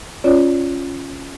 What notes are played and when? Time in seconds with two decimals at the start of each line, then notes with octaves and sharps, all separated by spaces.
0.24 C#4 F4 C#5 D5